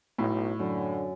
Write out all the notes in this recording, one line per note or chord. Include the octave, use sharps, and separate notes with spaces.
B1 A2
F#2 D3